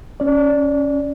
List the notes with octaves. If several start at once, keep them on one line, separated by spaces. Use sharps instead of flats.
C#4 D5